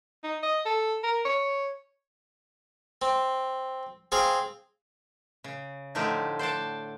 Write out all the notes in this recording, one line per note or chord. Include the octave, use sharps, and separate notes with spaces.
D#4
D#5
A4
A#4
C#5
C4
C4 G#4 F5
C#3
A2 D3 F3 A3 D#4 G4
C5 D5 F#5 A5